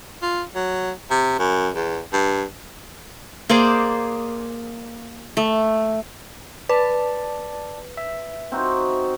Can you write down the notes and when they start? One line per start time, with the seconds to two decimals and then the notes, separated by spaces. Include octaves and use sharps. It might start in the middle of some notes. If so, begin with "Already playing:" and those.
0.22 F4
0.55 F#3
1.10 C3
1.39 F#2
1.75 E2
2.13 G2
3.49 A#3 G#4 C5 D5
5.37 A3
6.69 B4 D5 A5
7.97 E5
8.52 C4 D#4 F#4